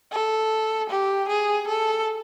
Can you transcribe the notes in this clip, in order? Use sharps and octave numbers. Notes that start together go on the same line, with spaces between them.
A4
G4
G#4
A4